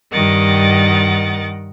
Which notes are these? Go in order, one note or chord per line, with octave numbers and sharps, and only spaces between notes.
G2 D#3 A#4 D#5 F#5 A6